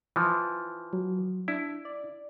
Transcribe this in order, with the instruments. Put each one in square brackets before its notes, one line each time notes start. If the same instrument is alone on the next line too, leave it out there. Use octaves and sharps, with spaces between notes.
[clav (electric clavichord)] E3 F3
[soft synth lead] F#3
[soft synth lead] D4 [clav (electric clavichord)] E4
[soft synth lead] D5